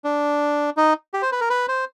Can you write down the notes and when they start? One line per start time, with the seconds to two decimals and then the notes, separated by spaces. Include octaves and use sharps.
0.04 D4
0.77 D#4
1.14 G4
1.22 C5
1.32 B4
1.41 A#4
1.50 B4
1.68 C5